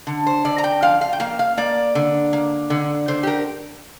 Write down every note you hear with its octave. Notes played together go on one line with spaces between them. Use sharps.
D3
C5
D3 D5
A#5
G5
F3 F5
F5
G5
A#3 F5
F5
A#3 D5
D3
A#3
D3
D3 C5
G4
A#4